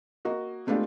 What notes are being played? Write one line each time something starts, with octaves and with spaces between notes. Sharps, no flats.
A#3 F#4 D#5
G#3 A3 B3 D4 F4 G4